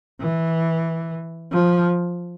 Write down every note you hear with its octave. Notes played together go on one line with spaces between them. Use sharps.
E3
F3